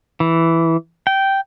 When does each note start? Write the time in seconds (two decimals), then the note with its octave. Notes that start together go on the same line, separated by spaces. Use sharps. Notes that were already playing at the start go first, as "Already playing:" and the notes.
0.20 E3
1.07 G5